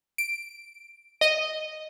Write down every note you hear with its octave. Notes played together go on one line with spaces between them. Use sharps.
D7
D#5